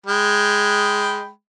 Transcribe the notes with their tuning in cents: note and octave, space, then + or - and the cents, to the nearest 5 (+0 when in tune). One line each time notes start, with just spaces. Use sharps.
G#3 +0 G5 -5 B5 +0